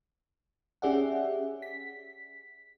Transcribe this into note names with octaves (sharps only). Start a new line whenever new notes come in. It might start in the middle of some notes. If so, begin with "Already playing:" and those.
C#4 G4 G#4 D5 E5 F#5
B6